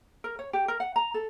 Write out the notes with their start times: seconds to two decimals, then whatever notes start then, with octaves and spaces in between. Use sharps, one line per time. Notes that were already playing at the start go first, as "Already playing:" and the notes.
0.24 A#4
0.39 C#5
0.53 G4
0.68 A#4
0.80 F#5
0.96 A#5
1.14 A4